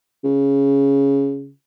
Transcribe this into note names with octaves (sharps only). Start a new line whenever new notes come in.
C#3